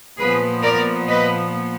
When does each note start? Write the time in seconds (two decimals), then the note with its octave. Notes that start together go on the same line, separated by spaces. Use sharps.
0.17 A#2 F3 B3 G#4 B4
0.63 A#4 D5
1.09 B4 D#5